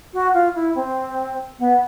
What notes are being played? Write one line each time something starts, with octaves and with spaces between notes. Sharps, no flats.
F#4
F4
E4
C4
B3